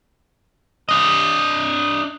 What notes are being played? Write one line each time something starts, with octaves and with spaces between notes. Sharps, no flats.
D4 D#5